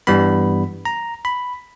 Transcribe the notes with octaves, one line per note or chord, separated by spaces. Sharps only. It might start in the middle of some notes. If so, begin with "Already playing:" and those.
G2 E3 G3 B3 B5
A#5
B5